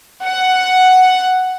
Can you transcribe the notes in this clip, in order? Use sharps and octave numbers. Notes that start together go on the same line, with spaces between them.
F#5